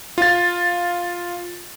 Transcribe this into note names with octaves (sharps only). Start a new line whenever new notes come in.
F4 A6